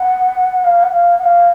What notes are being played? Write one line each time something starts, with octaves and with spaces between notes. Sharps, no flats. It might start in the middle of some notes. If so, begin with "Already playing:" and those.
Already playing: F#5
F5
F#5
F5
F#5
F5